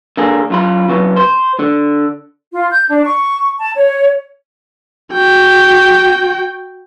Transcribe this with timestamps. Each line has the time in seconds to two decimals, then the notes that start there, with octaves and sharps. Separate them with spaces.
0.17 D3 A#3 G#4
0.50 F#2 F4 B5
0.88 C#3 F#3 B3
1.16 C5
1.59 D3
2.52 F4
2.71 G6
2.89 D4
3.04 C#6
3.60 A5
3.76 C#5
5.13 F#4 G5